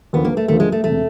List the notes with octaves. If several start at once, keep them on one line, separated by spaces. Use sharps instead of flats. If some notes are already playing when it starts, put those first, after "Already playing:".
D#2 D3 F3 B3
A#3
A3
D#2 D3 F3 A3
G#3
A3
E1 C3 A3